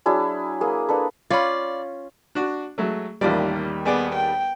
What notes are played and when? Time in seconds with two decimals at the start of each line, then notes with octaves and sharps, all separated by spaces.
0.06 F#3 D4 E4 G#4
0.61 A#3 G#4
0.89 A#3 D4 A4 B4
1.30 C#4 F4 D5 B5
2.35 D4 F#4
2.78 F#3 G#3 A3
3.21 A1 D#2 D#3 G3 F4 D5
3.86 B3 G#4 D5 D6
4.15 G5